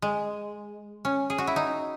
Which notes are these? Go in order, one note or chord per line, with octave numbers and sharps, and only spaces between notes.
G#3
C#4
G#4
F#4
E4
D#4